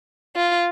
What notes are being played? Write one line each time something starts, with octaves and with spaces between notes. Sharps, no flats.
F4